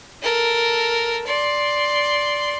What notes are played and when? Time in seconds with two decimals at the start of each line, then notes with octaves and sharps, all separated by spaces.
0.22 A4 A#4
1.26 D5 C6